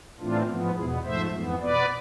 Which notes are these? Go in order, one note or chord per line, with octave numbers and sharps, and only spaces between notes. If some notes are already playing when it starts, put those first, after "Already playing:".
A2 E3 A3 C4 D4 F4
G#2 F3 B3
E2 B2 B3 E4 G#4
G#2 F3 A3 C5 E5
F2 E3 B3
B2 B3 B4 D5